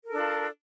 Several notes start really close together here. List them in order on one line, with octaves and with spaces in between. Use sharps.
A#4 A4 D4 F4